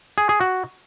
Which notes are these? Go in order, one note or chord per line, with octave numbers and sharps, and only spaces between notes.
G#4
G#4
F#4